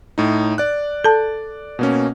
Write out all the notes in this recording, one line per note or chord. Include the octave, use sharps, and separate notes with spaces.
A2 D#4
D5 F#6
A4 A5
B2 A#3 C#4